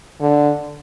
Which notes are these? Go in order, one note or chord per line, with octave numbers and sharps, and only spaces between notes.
D3